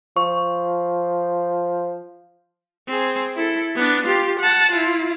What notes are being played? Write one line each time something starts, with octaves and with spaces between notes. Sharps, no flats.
F3 C#6
C4 G#4
E4 A4
B3 D4
F4 G4
F#5 A5
E4 F4